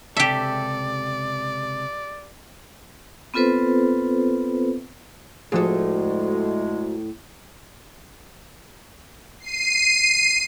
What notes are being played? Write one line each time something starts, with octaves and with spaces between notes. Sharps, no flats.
C#2 C3 G4 A4 D5 E5
B3 C4 F4 A4 B4 C5
D2 A2 F3 G#3 F#4 G#4 A4
C7 D#7